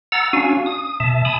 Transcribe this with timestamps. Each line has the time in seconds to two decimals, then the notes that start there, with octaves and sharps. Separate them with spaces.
0.12 F#5 A#5 E6 A6
0.33 C#4 D4 F#4 F5 G#5
0.66 D#6
1.00 B2 E5 A5
1.25 G#5 A5 B5 D#6